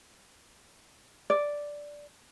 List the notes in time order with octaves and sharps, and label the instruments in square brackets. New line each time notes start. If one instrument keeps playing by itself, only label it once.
[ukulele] D5